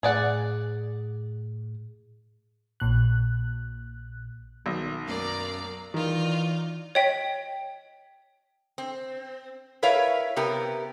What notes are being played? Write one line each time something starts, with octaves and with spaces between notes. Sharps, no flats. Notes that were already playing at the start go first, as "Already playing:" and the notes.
A2 G#4 D5 F#5
A#1 A#2 F#6
B1 D#3
F#2 A#3 D5 A#5
D#3 E3 D#4 F4 D5
C#5 D#5 G5 B6
C4
E4 A#4 B4 C#5 F5
C3 B3 G4 A#4